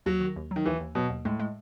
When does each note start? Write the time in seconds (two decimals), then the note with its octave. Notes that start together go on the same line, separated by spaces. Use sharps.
0.06 D#2 F#3
0.20 D#3
0.36 D#2
0.51 F#3
0.56 D#3
0.66 D#2 E3
0.80 D#2
0.95 B2 F#3
1.10 D#2
1.25 A2 G#3
1.40 G#3